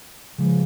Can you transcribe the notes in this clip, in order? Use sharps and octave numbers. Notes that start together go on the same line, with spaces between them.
C#3 F3 G#3